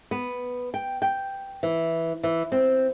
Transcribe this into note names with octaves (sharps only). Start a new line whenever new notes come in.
B3
G5
G5
E3
E3
C4